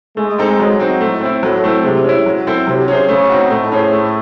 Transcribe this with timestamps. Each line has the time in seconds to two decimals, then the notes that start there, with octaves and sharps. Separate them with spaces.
0.17 G#3 A3
0.38 C4 D#4 A4
0.60 F#3
0.80 C4 D#4 F#4
1.00 A2 A3
1.21 C4 E4
1.42 A2 F#3
1.64 A3 C4 E4
1.84 C3 G#3
2.04 C#4 E4
2.26 F#3
2.47 C4 E4 A4 C5
2.67 C3 F#3
2.88 C#4 G#4 C5
3.09 C#3 A3
3.29 C4 D#4 F#4
3.51 A2 A3
3.72 C#4 G#4 C5
3.92 A3